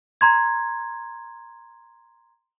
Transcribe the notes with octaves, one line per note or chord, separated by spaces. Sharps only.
A#5 C6 G#6